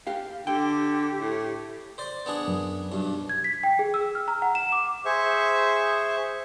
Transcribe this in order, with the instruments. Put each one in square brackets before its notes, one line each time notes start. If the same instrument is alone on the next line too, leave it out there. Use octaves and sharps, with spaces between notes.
[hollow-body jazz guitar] G4 F5
[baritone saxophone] D3 [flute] G4 [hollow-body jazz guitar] G5
[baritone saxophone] A2
[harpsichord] C5 D5
B3 D4 G#4
[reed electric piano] F#2
[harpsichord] B1 G2
[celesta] G#6
B6
G5
G#4
E6
F6
A#5
F#5
E7
D6
[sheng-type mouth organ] G#4 C5 E5 C#6